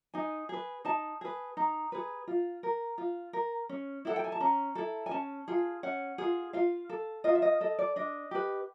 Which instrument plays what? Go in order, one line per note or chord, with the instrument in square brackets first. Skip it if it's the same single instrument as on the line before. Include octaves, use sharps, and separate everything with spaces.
[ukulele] D#4 G#5
G#4 B4
D#4 A5
G#4 B4
D#4 A#5
G#4 B4
F4
A#4
F4
A#4
C#4
E4 A4 F#5
G5
G#5
A5
C#4 A#5
E4 A4
G#5
C#4 A5
F4 G#4
C#4 F#5
F4 G#4
F4 F5
A4
F4 D#5
E5
D#5
A4 D#5
D5
D4 D#5
G4 B4